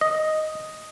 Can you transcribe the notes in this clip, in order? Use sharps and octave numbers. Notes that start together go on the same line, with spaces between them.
D#5